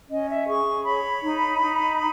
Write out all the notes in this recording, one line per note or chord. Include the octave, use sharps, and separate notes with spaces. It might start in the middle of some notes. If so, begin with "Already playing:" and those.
C#4 D#5
E5
G#4 C#6
C#5 B5
D#4
D#4